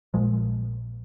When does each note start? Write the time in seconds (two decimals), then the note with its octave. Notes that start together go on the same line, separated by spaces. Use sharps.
0.14 A#1 A#2 F3 G#3